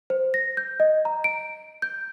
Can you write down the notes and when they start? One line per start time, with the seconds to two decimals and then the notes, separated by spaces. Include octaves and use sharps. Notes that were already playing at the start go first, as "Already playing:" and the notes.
0.10 C5
0.34 A#6
0.57 G6
0.80 D#5
1.05 A#5
1.24 D7
1.82 G6